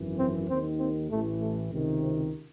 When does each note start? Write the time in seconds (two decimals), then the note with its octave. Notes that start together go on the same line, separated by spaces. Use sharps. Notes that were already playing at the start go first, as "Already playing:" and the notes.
Already playing: G#1 F#2 E3
0.19 C4
0.49 D#2 D#3 C4
0.80 C4
1.11 A1 A2 E3 A3
1.41 A3
1.72 C#2 C3 D#3
2.02 C4